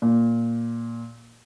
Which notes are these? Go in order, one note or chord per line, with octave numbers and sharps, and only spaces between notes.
A#2